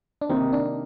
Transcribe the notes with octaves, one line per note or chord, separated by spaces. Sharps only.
D4
C3 D#3 A#3 C4 D#4
D4